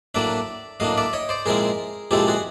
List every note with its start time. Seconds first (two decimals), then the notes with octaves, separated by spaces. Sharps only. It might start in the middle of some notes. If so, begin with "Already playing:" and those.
0.15 A2 F#3 A#3 D4 D5 E5
0.80 A2 F#3 A#3 D4 D#5 F5
0.98 D5 E5
1.13 C#5 D#5
1.29 C5 D5
1.46 A#2 F3 G#3 C4 E4 G#4 A#4
2.11 A#2 F3 G#3 C4 E4 G4 A4
2.28 F#4 G#4